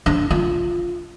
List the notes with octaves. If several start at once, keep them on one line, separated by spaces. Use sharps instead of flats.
D4
F4